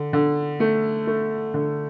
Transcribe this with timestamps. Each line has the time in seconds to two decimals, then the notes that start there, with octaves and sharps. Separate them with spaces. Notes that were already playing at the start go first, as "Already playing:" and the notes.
Already playing: D3
0.13 D3
0.60 A3
1.07 A3
1.54 D3